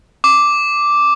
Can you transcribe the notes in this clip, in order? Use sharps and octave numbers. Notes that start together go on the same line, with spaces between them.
D6